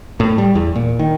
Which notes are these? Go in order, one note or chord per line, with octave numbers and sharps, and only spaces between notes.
A2
G3
E2
A#2
D#3